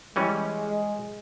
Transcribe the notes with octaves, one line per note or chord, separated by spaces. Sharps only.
E3 G3 G#3 C#4